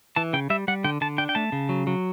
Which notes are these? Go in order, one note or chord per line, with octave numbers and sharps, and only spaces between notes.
E3 A5
C#3 G5
G3 E5
G3 F#5
D3 G5
D3 A5
D4 G5
G5
A3 A5
C#3
F#3
F#3